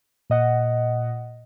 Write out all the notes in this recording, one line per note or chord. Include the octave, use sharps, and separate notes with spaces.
A#2 D#5 F#5